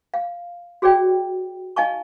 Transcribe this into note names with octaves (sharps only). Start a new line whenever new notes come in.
F5
F#4 G#4 C#5 D5 G5
D#4 D#5 F5 G#5 A5 C#6